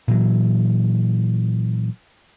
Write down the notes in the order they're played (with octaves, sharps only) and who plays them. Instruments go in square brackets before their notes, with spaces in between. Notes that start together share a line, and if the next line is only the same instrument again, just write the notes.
[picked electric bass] A#2 E3 F#3